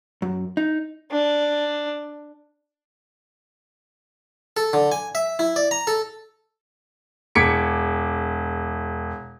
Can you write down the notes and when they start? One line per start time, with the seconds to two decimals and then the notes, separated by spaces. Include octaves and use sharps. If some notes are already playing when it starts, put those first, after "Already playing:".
0.22 F#2
0.57 D#4
1.12 D4
4.57 A4
4.73 D3
4.92 G#5
5.15 E5
5.39 E4
5.56 D5
5.71 A#5
5.87 A4
7.35 E1 D6 G#6 B6 C#7 D7